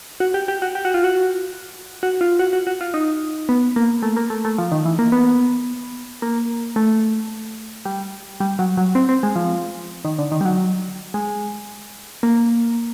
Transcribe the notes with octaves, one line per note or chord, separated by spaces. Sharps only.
F#4
G4
G4
F#4
G4
F#4
F4
F#4
F#4
F4
F#4
F#4
F#4
F4
D#4
B3
A#3
A3
A#3
A3
A3
F3
D#3
E3
A#3
B3
A#3
A3
G3
G3
F#3
F#3
C4
C4
G#3
F3
D#3
D3
D#3
G3
F#3
G#3
A#3